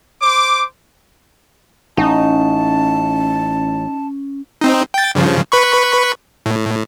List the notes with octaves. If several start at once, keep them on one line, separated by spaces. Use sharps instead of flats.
C5 D6
A1 C#4 D#4 A5
C4 D#4
G5 A6
G2 C#3 F3
B4 B5 C#6
A2